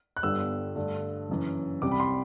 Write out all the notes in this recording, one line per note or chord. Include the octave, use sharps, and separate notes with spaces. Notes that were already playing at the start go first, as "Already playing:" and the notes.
F#6
G1 G2 D3 G3 B3 E6
G2 D3 A3 D4
F#1 F#2 E3
C2 C3 G3 D6
B5
C6